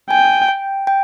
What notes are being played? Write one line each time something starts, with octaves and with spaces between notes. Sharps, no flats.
G5 G#5
G5
G5